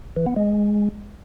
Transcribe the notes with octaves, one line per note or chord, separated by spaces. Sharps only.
E3
B3
G#3